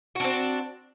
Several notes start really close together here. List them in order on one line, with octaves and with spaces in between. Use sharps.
F#4 D4 C4